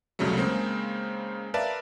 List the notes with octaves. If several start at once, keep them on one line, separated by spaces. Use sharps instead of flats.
C2 F2 C#3 F#3 G3 A3
C#3 G#3 A#3 C4
A#4 B4 D5 E5 F5 A5